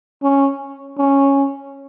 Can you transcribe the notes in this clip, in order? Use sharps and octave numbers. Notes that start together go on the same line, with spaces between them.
C#4
C#4